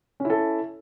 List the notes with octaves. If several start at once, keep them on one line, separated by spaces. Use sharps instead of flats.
C#4 E4 A4